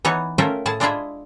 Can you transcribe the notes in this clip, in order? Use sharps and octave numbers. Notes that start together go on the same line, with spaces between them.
E3 B3 D#4 C#5
A3 C#4 F4 A#4 E5 G5
A2 G#4 A5
G#3 D4 E4 F4 G#4 E5